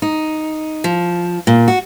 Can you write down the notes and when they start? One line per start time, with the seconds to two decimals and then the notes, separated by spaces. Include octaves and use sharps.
0.02 D#4
0.84 F3
1.47 A#2
1.68 F#4